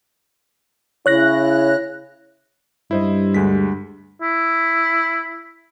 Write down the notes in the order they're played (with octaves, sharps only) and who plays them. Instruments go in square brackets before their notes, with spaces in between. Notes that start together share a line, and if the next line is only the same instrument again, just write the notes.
[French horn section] C#3 E4 [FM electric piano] C#5 F#6 A#6
[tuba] G2 [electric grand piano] E4 C5 D#5
[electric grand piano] D2 G#3 B6
[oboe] E4